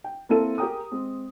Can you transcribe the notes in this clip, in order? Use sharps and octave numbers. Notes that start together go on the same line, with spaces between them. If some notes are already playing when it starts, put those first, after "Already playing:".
G5
A#3 C4 E4 A4 D#7
G4 G#4 A#4 G5 A#5 D#6
G#3 C4